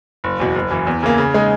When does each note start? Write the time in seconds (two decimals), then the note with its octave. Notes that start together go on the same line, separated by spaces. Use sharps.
0.24 F#1
0.40 E2 B2
0.56 F#1
0.70 F#2 E3
0.87 E2
1.03 C#3 E3 A#3
1.18 C#3
1.34 G#3 D#4